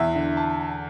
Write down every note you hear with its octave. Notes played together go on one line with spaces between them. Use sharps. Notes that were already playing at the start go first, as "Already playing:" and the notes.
Already playing: E2 E5
D3
A5